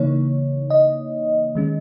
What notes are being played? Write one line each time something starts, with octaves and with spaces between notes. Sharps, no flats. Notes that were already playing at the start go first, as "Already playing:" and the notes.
Already playing: C#3 E3 A#3 D#4 C#5
D#5
D#3 G#3 C#4